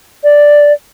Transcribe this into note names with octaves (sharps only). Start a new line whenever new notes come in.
D5